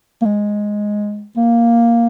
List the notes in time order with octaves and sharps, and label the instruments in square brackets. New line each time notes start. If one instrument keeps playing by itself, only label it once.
[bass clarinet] A#3
G#3
A#3